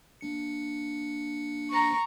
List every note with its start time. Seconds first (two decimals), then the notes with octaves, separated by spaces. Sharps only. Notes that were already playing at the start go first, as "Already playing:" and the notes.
0.21 A#3 D4 C#7
1.70 A#5 C#6